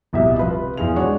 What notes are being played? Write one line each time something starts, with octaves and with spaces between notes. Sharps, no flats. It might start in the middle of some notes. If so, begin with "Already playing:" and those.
D1 C2 B2 E4 G4 E5
C3 F3 F4 B4
E2 E4 F4 G#4 F5 F7
G#3 D4 F#4 C#5